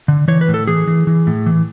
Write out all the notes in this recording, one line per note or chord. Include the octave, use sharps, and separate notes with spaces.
D3
E3 C#5
B4
A2
A4
E3 G#4
E3
E3
A2
E3